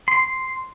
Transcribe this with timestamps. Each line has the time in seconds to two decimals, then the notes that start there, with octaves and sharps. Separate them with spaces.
0.08 C6